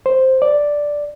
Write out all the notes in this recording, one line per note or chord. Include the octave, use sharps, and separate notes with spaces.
C5
D5